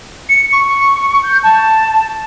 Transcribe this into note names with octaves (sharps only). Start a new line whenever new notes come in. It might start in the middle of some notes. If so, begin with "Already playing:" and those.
C#7
C#6
G6
A5